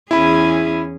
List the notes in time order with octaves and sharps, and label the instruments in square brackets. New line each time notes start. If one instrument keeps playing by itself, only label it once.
[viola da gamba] E2 C#4 G#4 [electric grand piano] E4 B5